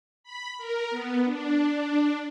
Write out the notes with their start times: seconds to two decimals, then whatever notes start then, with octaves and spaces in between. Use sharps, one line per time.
0.24 B5
0.58 A#4
0.90 B3
1.25 D4